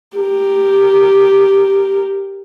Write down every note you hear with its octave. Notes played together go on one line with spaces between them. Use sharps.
G4 A#4